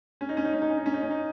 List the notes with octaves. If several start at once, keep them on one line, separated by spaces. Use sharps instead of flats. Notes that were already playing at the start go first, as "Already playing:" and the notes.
C#4
D#4
C#4
D#4
C#4
D#4
C#4
D#4
C#4
D#4
C#4
D#4